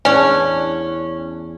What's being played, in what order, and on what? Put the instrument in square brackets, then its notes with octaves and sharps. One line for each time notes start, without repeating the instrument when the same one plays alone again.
[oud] E2 D4 [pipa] C#4